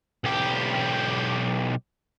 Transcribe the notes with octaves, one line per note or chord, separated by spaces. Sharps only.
B1 G4